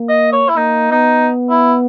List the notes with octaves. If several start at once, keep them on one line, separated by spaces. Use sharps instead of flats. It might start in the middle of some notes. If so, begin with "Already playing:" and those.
Already playing: A#3
D#5
C#5
E4
A#3 D#4
B3 D#4
E4